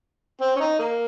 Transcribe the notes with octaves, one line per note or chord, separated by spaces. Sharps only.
C4
C#4
D#4
A#3